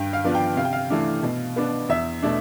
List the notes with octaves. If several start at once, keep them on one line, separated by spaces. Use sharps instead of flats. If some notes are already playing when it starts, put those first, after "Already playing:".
Already playing: G2 G5
F5
F3 B3 D4
G5
C3 F5
G5
F5
E3 A3 D4
B2
B3 D4
E2 E5
B2 A3 D4